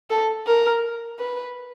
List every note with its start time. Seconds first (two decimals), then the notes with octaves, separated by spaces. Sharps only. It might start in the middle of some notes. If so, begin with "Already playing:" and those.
0.10 A4
0.47 A#4
1.19 B4